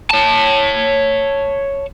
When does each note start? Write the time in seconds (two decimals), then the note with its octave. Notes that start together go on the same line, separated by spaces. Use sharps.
0.10 C#5 A5